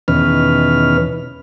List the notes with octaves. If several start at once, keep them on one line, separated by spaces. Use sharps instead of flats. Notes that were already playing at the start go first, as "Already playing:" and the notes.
E2 B2 D#3 C#4 B4 F6